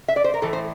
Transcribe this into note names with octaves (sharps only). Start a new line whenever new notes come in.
E5
D5
C5
A#4
A2 E3 A3 A4
C5